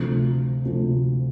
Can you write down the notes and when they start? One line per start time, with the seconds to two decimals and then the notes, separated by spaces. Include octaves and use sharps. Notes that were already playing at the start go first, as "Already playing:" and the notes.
Already playing: D2 C3 F3
0.65 D2 C3 F3